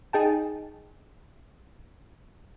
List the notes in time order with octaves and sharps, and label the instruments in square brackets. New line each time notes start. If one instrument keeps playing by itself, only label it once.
[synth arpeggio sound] D#4 G#4 G5 A5